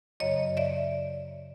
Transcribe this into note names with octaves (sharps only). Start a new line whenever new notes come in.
F#2 C#3 F#3 C#5 D#5
D5 E5